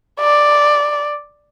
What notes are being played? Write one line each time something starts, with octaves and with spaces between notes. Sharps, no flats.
D5